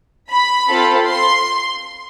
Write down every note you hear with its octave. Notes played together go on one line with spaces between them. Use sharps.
B5
C4 F4 A4
C6